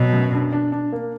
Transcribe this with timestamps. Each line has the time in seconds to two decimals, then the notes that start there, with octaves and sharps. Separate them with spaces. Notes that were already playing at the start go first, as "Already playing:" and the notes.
Already playing: B2 F#3
0.13 F#2
0.33 D4
0.52 D4
0.72 D4
0.92 A#3